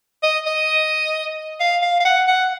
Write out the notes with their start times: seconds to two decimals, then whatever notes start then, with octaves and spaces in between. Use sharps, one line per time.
0.23 D#5
0.46 D#5
1.60 F5
1.82 F5
2.00 F5
2.05 F#5
2.28 F#5